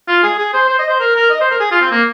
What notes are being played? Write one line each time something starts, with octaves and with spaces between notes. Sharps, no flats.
F4
G#4
G#4
C5
C5
D#5
C5
A#4
A#4
D#5
C5
A#4
G#4
F4
C4
A#3